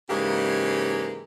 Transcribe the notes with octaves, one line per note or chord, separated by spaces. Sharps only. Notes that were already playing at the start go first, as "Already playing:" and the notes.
G#2 C#3 E3 G#3 A#3 G4